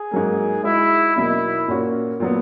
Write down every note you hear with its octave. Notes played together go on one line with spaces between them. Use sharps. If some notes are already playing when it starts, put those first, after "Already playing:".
Already playing: G#4
G#2 F#3 A#3
G#3 D#4 E4 F#4
E2 B2 F#3 A#3 D#4 E4
A#2 A#3 C#4 F#4
A#2 F#3 B3